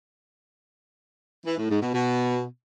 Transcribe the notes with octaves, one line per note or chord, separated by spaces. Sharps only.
E3
A2
G#2
B2
B2